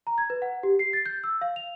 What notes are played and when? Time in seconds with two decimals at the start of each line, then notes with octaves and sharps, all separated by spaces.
0.07 A#5
0.18 G#6
0.30 B4
0.42 F#5
0.63 G4
0.79 C7
0.93 A6
1.06 G6
1.24 E6
1.41 F5
1.56 F7